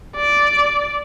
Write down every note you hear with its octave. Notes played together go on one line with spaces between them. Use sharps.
D5